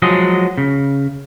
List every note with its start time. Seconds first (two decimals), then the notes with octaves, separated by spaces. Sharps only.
0.02 F3 F#3 G#3 D#5
0.58 C#3